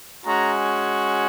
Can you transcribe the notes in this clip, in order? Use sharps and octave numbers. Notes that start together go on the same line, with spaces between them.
G#3 C#4 F#4 A#5